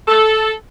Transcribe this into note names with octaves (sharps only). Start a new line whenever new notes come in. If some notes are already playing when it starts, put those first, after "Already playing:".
A4